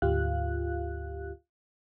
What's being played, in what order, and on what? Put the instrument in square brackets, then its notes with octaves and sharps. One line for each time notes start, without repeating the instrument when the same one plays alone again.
[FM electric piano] D2 G#2 F4 G4 F5 F#6